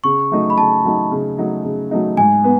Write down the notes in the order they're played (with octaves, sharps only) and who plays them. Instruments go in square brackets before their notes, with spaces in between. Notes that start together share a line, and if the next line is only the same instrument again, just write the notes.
[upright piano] C#3 [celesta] C#6
[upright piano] F#3 A3 D#4
[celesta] B5
[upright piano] C#3 [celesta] A5
[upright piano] F#3 A3 D#4
C#3
F#3 A3 D#4
C#3
F#3 A3 D#4
[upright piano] G#2 [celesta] G#5
[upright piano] B3